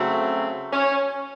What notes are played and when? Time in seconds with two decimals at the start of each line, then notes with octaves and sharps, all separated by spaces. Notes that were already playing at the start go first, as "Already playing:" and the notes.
Already playing: C#3 F#3 A3 C4
0.72 C#4